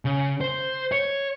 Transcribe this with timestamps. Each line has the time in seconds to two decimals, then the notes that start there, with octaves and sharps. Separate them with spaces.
0.05 C#3
0.41 C5
0.92 C#5